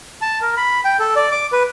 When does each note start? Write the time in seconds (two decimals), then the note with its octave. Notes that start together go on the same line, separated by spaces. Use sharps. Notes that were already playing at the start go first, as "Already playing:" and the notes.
0.22 A5
0.42 A#4
0.57 B5
0.85 G5
1.00 A4
1.16 D5
1.31 D6
1.53 B4